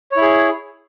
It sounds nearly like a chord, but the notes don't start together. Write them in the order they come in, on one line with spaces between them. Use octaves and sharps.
C#5 E4 G#4